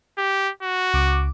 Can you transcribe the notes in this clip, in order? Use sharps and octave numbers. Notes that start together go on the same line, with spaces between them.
G4
F#4
C#2 D6